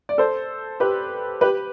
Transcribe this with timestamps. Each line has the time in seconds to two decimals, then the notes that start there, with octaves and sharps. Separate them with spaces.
0.09 D5
0.18 A4 C5
0.80 G4 B4
1.41 G4 B4